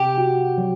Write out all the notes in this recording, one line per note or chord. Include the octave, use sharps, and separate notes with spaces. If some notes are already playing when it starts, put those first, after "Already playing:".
Already playing: C3 G4
F#4
F#3